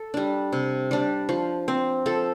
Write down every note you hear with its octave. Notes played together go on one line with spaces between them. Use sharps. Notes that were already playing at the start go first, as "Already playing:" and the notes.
Already playing: A4
G3 D4
C3
G3 D4
F3
C4
F3 A4